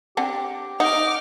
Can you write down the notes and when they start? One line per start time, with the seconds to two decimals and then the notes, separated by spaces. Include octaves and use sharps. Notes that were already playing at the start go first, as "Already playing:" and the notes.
0.17 C4 D4 G4 F#5
0.80 D#4 F#5 D6 F6